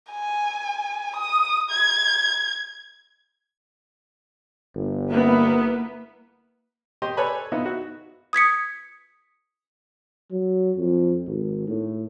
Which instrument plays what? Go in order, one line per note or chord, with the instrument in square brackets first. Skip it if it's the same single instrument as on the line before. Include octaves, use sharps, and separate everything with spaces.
[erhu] G#5
D#6
G#6
[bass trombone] G1
[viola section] A#3 B4 [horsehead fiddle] B3 E4
[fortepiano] G4 D#5 C6
A4 B4 C#5 D5 G#5 B5
B3 D#4 F4 E5
F#4
[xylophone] D#6 G#6 B6 C#7
[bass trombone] F#3
F2
G#1
A2